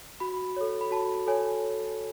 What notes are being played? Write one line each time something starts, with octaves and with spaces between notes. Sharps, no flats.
F#4 B5
A4 C#5
B5
F#4 A5
A4 C#5 G#5